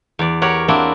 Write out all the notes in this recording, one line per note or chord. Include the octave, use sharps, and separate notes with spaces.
E2 D5
G4 A#4 C#5 F#5
A#3 C4 D4 E4 F#4